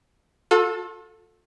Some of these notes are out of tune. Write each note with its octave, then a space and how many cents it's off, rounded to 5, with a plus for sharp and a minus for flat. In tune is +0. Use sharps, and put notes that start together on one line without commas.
F4 +45 A4 +5